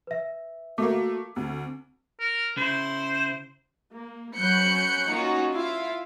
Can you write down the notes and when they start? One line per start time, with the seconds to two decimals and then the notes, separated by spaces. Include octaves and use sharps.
0.07 B4 E5
0.78 A3 A#3 F#4 D6
1.36 D2 C4
2.20 A#4
2.57 C#3 E4 C5
3.91 A#3
4.36 F#3 C#4 B5 F#6 G6 C#7
5.09 A#3 C#4 D#4 F4 F#4
5.52 E4 F4 E5 F5